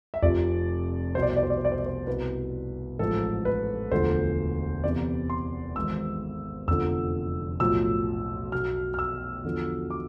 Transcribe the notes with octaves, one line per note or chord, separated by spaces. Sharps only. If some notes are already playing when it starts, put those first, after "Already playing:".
E5
F1 F2 C3 F3 D5
C2 B2 C5 D5
C5
D5
C5
D5
C5
D5
C5
D5
C5
C2 B2 B4
A1 G#2 F3 A4
B4
E1 D2 D3 F3 C5
E2 C3 E3 D5
C6
G#1 G#2 E3 E6
F1 E2 D3 F3 E6
B1 A2 F3 E6
B1 B2 F6
F6
E6
E2 D3 F3
D6